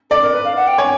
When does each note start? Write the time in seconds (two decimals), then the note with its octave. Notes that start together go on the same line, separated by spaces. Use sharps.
0.10 A4 D5
0.22 A#4
0.33 B4
0.45 F5
0.56 F#5
0.67 G5
0.78 C#5 G#5